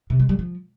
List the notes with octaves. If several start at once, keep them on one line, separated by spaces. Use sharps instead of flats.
C3
G#3
G3
F3